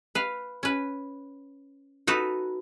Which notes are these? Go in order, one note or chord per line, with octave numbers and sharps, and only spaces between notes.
B4 F5
C#4 B4
D#4 F#4 A4 B4